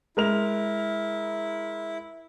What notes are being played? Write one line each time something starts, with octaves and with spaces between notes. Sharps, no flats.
G#3 E4 A#4 F7